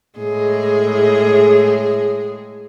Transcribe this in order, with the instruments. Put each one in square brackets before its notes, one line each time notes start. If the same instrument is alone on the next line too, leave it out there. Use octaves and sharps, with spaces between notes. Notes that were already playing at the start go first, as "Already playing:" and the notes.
[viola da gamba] A2 G#3 G#4